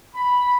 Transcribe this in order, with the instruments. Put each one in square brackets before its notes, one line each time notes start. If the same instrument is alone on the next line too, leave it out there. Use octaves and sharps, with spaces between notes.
[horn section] B5